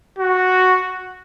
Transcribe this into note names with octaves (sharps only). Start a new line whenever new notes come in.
F#4